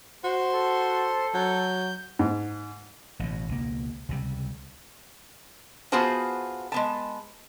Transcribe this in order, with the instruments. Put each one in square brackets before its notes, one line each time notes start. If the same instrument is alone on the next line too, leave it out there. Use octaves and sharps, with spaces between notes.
[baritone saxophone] F#4 [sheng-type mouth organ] C5 C6
[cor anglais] A4
[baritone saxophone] F#3 [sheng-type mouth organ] G6
[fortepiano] G#2
[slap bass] A1 B2
C#2 B2 A#3
C#2 C3 G3
[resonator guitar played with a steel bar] B3 F4 F#4 G#4 C5 A5
G#3 B3 A5